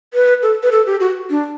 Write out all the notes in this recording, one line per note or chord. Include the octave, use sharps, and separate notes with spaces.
B4
A4
B4
A4
G4
F#4
D4